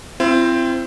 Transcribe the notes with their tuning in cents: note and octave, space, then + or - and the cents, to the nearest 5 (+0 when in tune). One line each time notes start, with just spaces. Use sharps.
C4 +0 E4 +40